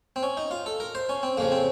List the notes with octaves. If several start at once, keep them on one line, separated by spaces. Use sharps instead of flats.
C4
C#4
D#4
F4
A4
A#4
C5
C#4
C4
F2 C#3 F3 A#3
C4